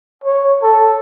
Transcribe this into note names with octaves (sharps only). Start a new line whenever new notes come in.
C#5
A4